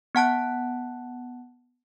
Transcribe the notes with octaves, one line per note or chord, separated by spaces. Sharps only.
B3 F#5 A5 F#6